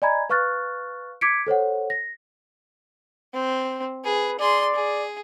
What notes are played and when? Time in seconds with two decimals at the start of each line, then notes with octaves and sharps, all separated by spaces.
0.02 D5 D#5 G#5 A#5 B5 G#6
0.30 B4 F5 C#6 F6 F#6 A6
1.21 D6 G#6 B6 C#7 D7
1.47 A4 C5 C#5 F#5
1.90 A#6
3.34 C4
4.05 G#4 B4
4.39 G#4 D5 C6
4.75 G#4